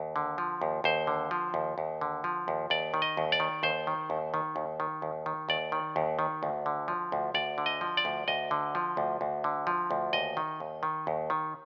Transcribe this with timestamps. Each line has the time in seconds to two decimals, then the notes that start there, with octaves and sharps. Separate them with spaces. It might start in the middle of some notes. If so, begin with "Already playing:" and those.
Already playing: D#2
0.16 D3
0.38 F3
0.62 D#2
0.84 D#2 C5
1.07 D3
1.31 F3
1.54 D#2
1.78 D#2
2.01 D3
2.24 F3
2.48 D#2
2.70 D#2 D5
2.94 D#3
3.02 D#5
3.17 D#2
3.32 D5
3.40 D#3
3.63 D#2 C5
3.87 D#3
4.10 D#2
4.34 D#3
4.56 D#2
4.80 D#3
5.02 D#2
5.26 D#3
5.49 D#2 D5
5.72 D#3
5.96 D#2
6.19 D#3
6.43 D2
6.66 D3
6.88 F3
7.12 D2
7.34 D2 D5
7.58 D3
7.66 D#5
7.81 F3
7.97 D5
8.05 D2
8.28 D2 D#5
8.51 D3
8.75 F3
8.97 D2
9.21 D2
9.44 D3
9.67 F3
9.91 D2
10.13 D#2 D#5
10.37 D#3
10.60 D#2
10.83 D#3
11.07 D#2
11.30 D#3